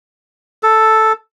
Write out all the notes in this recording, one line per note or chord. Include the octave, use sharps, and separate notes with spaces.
A4